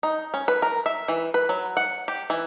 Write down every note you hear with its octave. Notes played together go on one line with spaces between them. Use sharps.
D#4
C#4
B4
A#4
E5
E3
B4
F#3
F#5
G4
E3